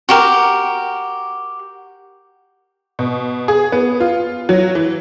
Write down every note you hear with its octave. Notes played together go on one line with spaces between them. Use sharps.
F#4 G4 A#4
B2
G#4
B3
F4
F#3
E3